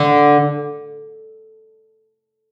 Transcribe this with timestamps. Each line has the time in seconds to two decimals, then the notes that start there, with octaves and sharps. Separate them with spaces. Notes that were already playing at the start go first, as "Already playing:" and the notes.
Already playing: D3